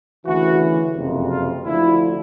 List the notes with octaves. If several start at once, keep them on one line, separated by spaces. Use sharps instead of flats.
D2 C#3 E3 F#4
F#1 F2 C3
F4
D2 D3 F3 E4